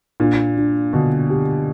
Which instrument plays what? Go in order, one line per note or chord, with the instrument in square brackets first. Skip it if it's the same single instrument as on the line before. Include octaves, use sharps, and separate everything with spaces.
[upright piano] A#2 [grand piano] D4
[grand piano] D4
[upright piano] B2 [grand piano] D3
[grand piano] G4